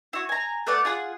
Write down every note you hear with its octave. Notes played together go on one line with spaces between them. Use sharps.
E4 F#4
G#5 A#5
A3 B3 D5 F#5
F4 G#4 F#5